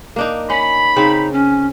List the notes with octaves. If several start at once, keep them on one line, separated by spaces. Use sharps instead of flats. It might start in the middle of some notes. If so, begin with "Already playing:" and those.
A#3 D4 D#4
C#4 B5
C#3 C4 D#4
C#4